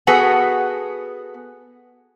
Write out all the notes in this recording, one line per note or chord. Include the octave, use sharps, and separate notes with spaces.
B3 F#4 G#4 A4